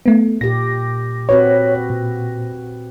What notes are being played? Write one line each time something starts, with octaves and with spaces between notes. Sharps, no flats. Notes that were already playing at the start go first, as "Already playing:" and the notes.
A3 B3
A#2 G4 A#6
C4 F#4 B4 C#5
A#2